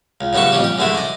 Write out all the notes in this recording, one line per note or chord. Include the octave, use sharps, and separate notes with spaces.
C#2
C#2 F#2 G3 B3 E5 C#6
A1 F2 G3 C#4 G4
G4
F#2 D3 G#3 A3 E4
D5 D#5